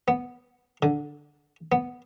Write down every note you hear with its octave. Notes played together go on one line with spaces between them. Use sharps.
B3
D3
B3